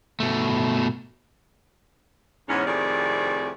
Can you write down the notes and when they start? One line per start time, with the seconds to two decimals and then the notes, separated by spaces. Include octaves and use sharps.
0.20 B2 A3
2.48 E2 G#2 C#4
2.67 F2 A2 C3 D#3 G#4 D5